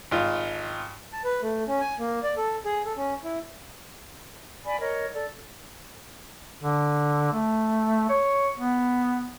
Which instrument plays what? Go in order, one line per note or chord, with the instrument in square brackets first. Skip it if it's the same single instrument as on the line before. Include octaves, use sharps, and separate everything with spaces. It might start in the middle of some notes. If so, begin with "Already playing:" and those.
[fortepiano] G#1 F4
[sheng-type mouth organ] A5
B4
A3
C#4
G#5
A#3
D5
A4
G#4
A4
C#4
E4
[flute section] D5 G#5 B5
A#4 C#5 D#5
A4 D5
[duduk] D3
A3
C#5
B3